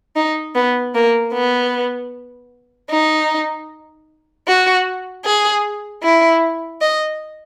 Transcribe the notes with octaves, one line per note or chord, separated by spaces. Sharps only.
D#4
B3
A#3
B3
D#4
F#4
G#4
E4
D#5